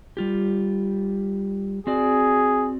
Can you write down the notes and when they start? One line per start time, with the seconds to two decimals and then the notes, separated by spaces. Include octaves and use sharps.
0.17 G3 F4 G4
1.87 C4 F#4 G#4 D5